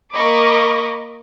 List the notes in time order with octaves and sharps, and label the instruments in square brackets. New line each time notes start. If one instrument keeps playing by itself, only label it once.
[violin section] A#3 A#4 D#5 B5 C#6 D6